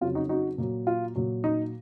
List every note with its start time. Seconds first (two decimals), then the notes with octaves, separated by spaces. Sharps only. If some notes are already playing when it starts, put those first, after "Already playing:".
0.01 F2 C#3 F#3 F4
0.15 D#4 F#4
0.29 D#4 F#4
0.58 A#2 F#3
0.87 F4
1.15 A#2 F#3
1.44 D#4